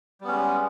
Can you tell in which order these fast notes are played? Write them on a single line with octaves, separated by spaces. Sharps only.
G3 B3 C#4 G#3